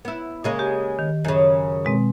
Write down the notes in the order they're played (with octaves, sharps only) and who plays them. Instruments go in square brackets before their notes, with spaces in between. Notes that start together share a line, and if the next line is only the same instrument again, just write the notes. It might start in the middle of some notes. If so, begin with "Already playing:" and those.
[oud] B3 E4
C#3 G#3 A#3
[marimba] G4
D#3
[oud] F#2 C#3
[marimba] B2 G#3 C4